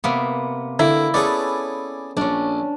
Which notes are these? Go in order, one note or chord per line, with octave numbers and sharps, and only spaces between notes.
C3 A#3 B3
D3 A#3 E4
B3 C#4 G#4 A4 D5
A#1 C#4 D4